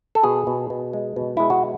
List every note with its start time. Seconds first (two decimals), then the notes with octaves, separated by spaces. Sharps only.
0.15 A4
0.23 B2 G#4
0.47 B2
0.70 B2
0.93 G#3
1.16 B2
1.37 G#3 E4
1.50 F#4